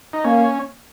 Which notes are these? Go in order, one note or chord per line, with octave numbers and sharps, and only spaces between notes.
D#4
A#3 C#4